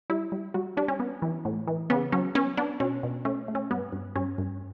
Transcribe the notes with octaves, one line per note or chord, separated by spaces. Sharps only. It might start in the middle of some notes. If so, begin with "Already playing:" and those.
G3 E4
G3
G3 F#4
G3 D4
C#4
B3
E3
A2
E3
C#3 B3
F#3 C#4
B3 C#4
B3 D4
B2 C#4
B2
A3 C#4
A3
C#4
G2 B3
G2
G2 C#4
G2